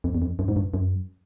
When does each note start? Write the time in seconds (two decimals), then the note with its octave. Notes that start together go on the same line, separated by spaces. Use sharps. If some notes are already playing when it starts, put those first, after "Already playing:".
0.04 F2
0.15 E2
0.22 F2
0.39 F#2
0.48 G#2
0.56 G2
0.74 F#2